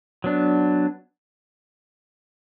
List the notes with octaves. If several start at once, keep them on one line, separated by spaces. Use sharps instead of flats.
F#3 B3 D4